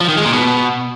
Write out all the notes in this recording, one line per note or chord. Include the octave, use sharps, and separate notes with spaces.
F3
D#3
G#3
A#2
B2